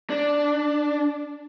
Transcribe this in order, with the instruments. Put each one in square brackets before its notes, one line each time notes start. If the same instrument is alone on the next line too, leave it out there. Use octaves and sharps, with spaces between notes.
[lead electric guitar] D4